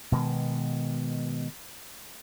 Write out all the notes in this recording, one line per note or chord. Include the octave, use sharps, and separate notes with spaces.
B2 D#3 G#3